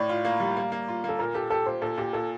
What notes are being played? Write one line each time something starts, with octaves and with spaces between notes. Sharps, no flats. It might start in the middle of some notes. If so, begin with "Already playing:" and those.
Already playing: A2 D5
F4
A#3
G3
A#3
A#3
F4
A#3 A4
A#2 A#4
G4 A4
G4 A4
A#2 C5
A#2 A4
A#2 G4
A#2 A4